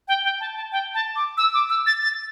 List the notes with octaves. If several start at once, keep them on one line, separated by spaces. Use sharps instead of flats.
G5
G5
A5
A5
G5
A5
D6
E6
D6
E6
A6
A6